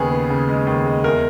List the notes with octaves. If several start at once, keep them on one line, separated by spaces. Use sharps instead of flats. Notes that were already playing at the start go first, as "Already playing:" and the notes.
Already playing: D#2 C#3 B3 G#4
B3
C#3
G#3
D#2
G#3
E2 A#4